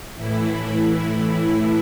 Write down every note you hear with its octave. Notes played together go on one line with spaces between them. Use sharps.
A2 E3 E4